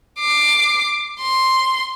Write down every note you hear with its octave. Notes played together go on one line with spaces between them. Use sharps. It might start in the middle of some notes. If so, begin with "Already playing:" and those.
D6 C7
C6